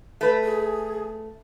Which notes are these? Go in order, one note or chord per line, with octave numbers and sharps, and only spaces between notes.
A3 B4
G#4